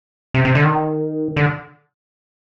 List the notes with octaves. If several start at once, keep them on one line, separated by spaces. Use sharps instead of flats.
C3
C3
D3
D#3
D3